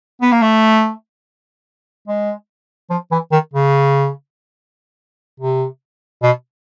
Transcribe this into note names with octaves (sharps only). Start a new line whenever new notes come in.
B3
A#3
A3
G#3
F3
E3
D#3
C#3
C3
B2